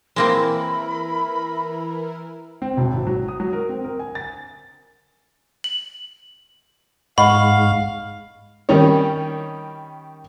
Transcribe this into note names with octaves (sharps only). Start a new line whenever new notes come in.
E3 G#3 A#3 C4 E4 A#4 B5
C4
E1
G#1
F#3
D#6
F#3
A#4
C4
A#4
G#5
A6
F#7
G#2 D#5 F5 F#5 B5 C#6
D#3 G3 C#4 D#4 C#5